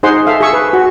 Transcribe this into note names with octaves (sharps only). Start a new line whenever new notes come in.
D#4 G#4 C5 F#5 C6
A4 E5 F5
G#4 C#6 E6
B4
F#4